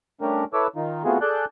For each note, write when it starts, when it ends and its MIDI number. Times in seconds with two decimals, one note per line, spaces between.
0.21 0.44 55
0.21 0.44 57
0.21 0.44 61
0.21 0.44 62
0.21 0.44 67
0.21 0.44 70
0.53 0.67 64
0.53 0.67 69
0.53 0.67 71
0.53 0.67 73
0.53 0.67 86
0.53 0.67 88
0.76 1.03 51
0.76 1.03 63
0.76 1.03 65
1.04 1.18 57
1.04 1.18 59
1.04 1.18 60
1.04 1.18 65
1.04 1.18 66
1.04 1.18 68
1.21 1.45 68
1.21 1.45 69
1.21 1.45 74
1.21 1.45 81
1.21 1.45 90
1.21 1.45 91